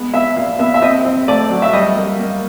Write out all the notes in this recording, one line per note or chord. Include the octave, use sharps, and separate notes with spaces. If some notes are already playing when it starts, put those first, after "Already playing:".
Already playing: G#3 B3
B3 E5
A#2 F5
B3 E5
E5
C4 D#5
C4
A3 D5
F#3
E5
G3 D#5
A#3
A#3